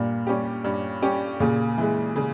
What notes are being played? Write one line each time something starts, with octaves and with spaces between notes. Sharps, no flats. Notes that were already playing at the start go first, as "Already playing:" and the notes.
Already playing: G2 A#2
G3 C#4 G4
G2
G3 C#4 G4
A#2 C#3
E3 G#3
C#3